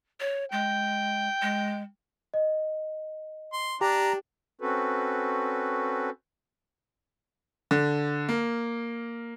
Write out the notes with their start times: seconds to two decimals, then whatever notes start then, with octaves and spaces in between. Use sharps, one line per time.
0.20 C#5
0.52 G#3 G5
1.42 G#3
2.34 D#5
3.53 C6
3.81 D4 G4 A#5
4.61 C4 C#4 F#4 A4 B4
7.71 D3
8.29 A#3